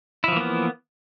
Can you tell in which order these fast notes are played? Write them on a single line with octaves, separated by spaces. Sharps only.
E4 F3 E3 A#3 B3